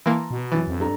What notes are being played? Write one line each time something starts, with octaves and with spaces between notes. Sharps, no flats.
E3 A#3 A5 A#5 C6
B2
F#2 E3 A6
F2
G2 A4 A#5